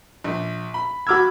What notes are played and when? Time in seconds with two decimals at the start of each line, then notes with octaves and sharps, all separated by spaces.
0.24 A#1
0.74 B5
1.07 F#4 B5 D6 E6 F6 G#6